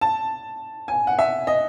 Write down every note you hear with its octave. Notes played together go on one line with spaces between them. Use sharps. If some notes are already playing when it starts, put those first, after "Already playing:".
A5
G#5
F#5
E5
D#5